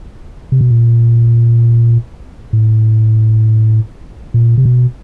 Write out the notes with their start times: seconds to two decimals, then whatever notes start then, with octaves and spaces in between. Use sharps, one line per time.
0.52 C3
0.61 B2
0.70 A#2
2.53 A2
4.34 A#2
4.57 C3
4.65 B2